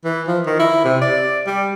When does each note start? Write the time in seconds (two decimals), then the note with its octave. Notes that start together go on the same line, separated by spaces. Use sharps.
0.05 E3
0.27 F3
0.46 D#3
0.60 E4
0.85 C3
1.01 D5
1.46 G3